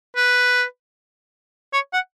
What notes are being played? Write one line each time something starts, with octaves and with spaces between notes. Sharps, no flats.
B4
C#5
F#5